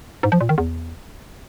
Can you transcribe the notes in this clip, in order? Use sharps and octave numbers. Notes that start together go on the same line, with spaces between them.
G#2
F3
A#2
D#3
E2